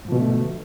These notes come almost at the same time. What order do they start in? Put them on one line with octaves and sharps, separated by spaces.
G#2 F3 B2 D3 A3